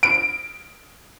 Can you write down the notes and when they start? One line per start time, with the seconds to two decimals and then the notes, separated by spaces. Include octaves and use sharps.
0.03 D7